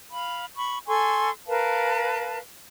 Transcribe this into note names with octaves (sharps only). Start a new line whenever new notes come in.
F5 B5
B5 C#6
A4 G#5 C6 C#6
A#4 B4 F5 A5